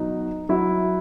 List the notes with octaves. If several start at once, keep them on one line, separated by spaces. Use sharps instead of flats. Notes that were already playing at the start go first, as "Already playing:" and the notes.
Already playing: B2 F#3 D#4
F#3 E4